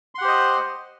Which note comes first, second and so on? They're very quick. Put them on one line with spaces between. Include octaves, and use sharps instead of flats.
C6 F#5 G4 C5 D#5